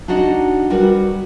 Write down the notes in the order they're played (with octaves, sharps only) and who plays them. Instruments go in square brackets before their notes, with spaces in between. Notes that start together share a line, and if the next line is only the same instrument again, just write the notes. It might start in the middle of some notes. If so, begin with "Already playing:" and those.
[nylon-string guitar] D4 D#4 F#4 D5 D#5
G3 F#4 A#4 B4